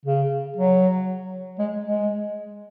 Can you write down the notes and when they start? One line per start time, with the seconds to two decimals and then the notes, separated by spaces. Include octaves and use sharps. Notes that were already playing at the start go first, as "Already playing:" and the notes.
0.05 C#3
0.57 F#3
1.59 G#3
1.84 G#3